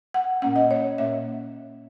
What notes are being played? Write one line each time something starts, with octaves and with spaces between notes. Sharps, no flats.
F#5
A#2 A#3 C#4 F#5
D#5
C#5
A#2 A#3 C#4 E5